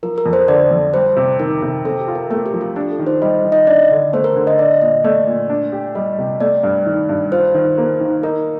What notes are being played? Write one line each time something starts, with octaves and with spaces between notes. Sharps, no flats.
F3 A#4
A#4
F2
C5
D3 D5
F2
G3 C5
C3
D#3 A#4
C3
C4 A4
G4
F4
A#4
A3 A#4
G4
F3
F4
D4 G4
A4
D#3
C5
G3 D#5
D#3
D#5
D4 D5
D3
A3 C5
A#4
D3
D#5
D4 D5
A#2 D#5
A3 D5
A#2
D4
G4
G3 D#5
C3
A3 D5
G2
D#3
G2
F4 C5
D#3
A#3
D#3
D#4 A#4